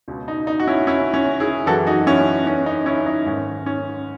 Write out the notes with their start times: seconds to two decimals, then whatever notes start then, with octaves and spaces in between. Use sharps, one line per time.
0.08 C#2 B2
0.28 D#4
0.47 D#4
0.60 F#4
0.67 C#4 E4
0.87 C#4 E4
1.14 C#4
1.40 E4 G#4
1.66 F#2 E3 F#4 A4
1.87 D#4 F#4
2.07 C#4 E4
2.47 C#4
2.66 D#4
2.86 C#4 E4
3.06 D#4
3.26 G#2 D#3 C#4
3.66 C#4